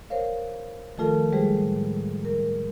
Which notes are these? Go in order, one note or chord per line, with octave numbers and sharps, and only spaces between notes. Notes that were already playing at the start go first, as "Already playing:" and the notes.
A#4 C5 C#5 F5
D#3 F3 A3 F4 A4 A#4
G3 G#3 G4 G#4 C5
A2
A#4